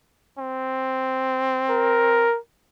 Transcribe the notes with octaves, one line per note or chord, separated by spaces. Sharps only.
C4
A#4